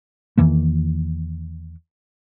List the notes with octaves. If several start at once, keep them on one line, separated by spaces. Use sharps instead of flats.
E2 D#3 E3 A#3